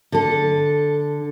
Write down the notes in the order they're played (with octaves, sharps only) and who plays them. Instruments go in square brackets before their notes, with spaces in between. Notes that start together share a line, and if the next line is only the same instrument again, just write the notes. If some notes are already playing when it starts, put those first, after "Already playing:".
[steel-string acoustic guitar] D3 A4